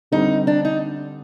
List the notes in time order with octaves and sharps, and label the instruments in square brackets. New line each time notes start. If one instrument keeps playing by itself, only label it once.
[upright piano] D3 G3 C4 [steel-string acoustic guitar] D#4
[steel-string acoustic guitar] D4
D#4